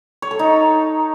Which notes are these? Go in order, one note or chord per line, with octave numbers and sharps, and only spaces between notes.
C#5
A4
D#4